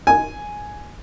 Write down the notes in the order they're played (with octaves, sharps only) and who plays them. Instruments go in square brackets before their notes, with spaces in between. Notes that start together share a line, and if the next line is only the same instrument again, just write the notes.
[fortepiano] G#5